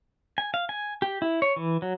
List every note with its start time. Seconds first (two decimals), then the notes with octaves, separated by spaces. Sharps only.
0.38 G#5
0.54 F5
0.69 G#5
1.02 G4
1.22 E4
1.42 C#5
1.56 E3
1.82 F#3